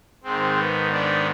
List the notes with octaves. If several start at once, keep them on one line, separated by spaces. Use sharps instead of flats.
G#2 D#3 G#3 C4
B3
B3 D4